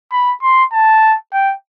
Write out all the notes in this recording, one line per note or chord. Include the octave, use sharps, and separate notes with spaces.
B5
C6
A5
G5